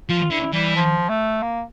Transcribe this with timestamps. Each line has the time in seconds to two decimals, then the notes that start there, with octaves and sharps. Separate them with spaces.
0.09 F3 F4
0.31 D3 E4
0.53 E3 G3
0.76 F3
1.09 A3
1.42 A#3